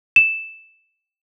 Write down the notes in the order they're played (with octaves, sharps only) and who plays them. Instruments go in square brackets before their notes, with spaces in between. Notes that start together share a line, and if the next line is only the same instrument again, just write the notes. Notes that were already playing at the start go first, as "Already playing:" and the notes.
[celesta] E7